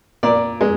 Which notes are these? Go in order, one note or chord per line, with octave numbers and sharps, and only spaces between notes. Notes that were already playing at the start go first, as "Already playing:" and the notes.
A#2 D5
G#3